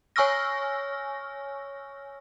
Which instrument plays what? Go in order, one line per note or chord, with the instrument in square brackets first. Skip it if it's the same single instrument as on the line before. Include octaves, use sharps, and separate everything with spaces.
[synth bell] C#5 G#5 C#6 E6 F6 A#6